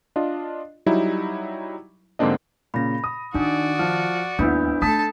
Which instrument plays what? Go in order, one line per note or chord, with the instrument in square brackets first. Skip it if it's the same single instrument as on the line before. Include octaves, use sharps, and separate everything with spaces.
[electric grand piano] D4 F4 D#5
F#3 G3 D#4 E4
G#2 D3 A#3 C4 D4 D#5
[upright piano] A#2 C#3 [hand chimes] B5 A#6
[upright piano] D#6
[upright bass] D#3 [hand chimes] D4 D#4 [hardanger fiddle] F#4 D5
[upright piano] F3 [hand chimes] F6
[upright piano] G#1 B3 E4 [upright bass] D#2 [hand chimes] D4 B5 G6
[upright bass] A3 [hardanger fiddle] A4 A5 [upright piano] D#6 B6